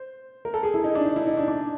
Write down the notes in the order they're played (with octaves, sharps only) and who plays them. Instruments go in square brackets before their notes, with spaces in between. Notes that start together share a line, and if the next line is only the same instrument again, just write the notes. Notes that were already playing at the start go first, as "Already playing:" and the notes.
Already playing: [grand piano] C5
A#4
A4
G#4
E4
D#4
D4
D#4
E4
D#4
D4
D4